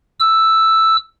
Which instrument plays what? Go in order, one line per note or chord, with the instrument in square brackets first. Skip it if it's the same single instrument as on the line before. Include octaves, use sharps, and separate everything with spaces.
[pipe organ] E6